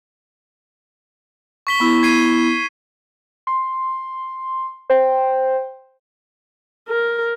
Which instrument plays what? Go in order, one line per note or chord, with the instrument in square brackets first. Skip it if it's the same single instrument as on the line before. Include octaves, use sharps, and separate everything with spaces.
[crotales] C#6 B6 G7
[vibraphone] B3 E4
[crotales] G#6 C7 D#7
[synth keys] C6
C5 G5
[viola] A#4